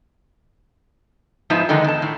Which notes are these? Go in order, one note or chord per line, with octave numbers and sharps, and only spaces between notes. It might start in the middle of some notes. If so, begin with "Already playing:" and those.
G#2 F3 B3 D#4 E4 A5
D3 D#3 G#3 B3 D#4
E2 A5
A2